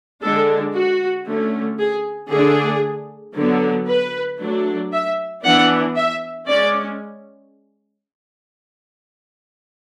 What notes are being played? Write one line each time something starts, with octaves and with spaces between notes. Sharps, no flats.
D3 G#3 D4 A4
F#4
D3 A3 C#4
G#4
D3 A3 D4 G#4
D3 F#3 B3
B4
F#3 A3 D4
E5
E3 B3 D4 F#5
E5
G#3 C#4 D5